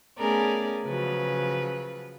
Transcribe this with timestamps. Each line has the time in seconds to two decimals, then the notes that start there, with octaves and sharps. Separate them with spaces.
0.18 A3 B3 C#4 G#4 A#4 D5
0.84 C#3 F3 F#3 B4